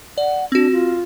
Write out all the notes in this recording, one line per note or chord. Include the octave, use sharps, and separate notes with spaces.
D5 F#5
C4 D4 F#4
F4